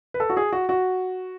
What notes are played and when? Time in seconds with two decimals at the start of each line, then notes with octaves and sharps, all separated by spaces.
0.14 B4
0.20 A4
0.30 F#4
0.37 G#4
0.52 F#4
0.69 F#4